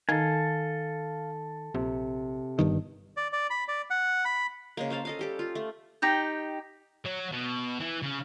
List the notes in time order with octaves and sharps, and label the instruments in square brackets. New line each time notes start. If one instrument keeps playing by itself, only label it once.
[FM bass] D#3 [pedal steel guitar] A4 G#5 [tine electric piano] F5
[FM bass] A#1 [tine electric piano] C3
[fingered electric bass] G1 G2 D#3
[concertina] D5
D5
B5
D5
F#5
B5
[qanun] C#3 G#3 A#3
C#4 C5 F5 A5
A4 D#5 F5
G3 G4 A4
F4
A3
[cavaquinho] D#4 G4 G5
[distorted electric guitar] F#3
B2
E3
C#3